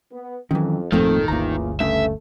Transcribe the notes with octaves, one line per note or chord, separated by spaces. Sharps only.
B3
F2 D#3 E3 F#3 C#4
G#1 F2 A#2 D#3 F3 A3 C4 A4
G1 D2 C#3 E3 A#3 F4 A#5
G2 C#3 A3 E5